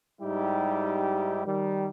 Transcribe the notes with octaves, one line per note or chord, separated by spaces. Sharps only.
G#2 G3 D#4 E4 G4
D#3 G3